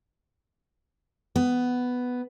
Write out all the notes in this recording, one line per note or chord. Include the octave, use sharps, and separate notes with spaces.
B3